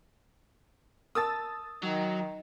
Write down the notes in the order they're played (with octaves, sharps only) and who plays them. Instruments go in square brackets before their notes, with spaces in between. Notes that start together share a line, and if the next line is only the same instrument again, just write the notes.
[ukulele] A#4 A5 [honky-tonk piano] D#6 E6 A6
[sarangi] D#3 [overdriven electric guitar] F#3